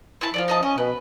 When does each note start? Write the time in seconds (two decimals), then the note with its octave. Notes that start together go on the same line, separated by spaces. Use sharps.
0.21 C4 E4 A5
0.34 F3 F4 A4 D5
0.48 D#4 D#5 A5
0.63 C#4 D#5
0.78 B2 B4